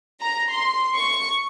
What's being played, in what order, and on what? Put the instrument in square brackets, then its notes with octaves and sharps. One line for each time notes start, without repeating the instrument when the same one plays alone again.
[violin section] A#5
C6
C#6